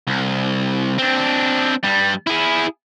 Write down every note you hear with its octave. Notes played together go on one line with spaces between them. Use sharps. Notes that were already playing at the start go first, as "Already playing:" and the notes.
C2
C4 D4
G2 G3
E4 G#4